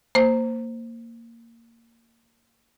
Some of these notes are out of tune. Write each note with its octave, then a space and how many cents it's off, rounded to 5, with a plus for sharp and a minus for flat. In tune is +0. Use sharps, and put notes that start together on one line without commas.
A#3 -15 C5 +0